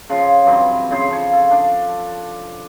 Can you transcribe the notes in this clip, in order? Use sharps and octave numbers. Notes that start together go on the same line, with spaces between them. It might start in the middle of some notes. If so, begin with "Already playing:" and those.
C#3 F3
G2 E3 F#3 C4
C#3 G#4 C5
C#3 F3 C#5
A4
D4